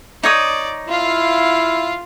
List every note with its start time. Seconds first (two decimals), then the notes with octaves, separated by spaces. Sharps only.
0.23 D#4 C#5 D5 D#6
0.89 E4 F4 F5